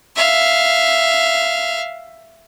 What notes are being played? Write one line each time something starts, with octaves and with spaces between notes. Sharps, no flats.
E5 F5